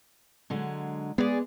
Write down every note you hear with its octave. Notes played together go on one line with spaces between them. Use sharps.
D3 F#3 G#3
G#3 B3 G#4 D5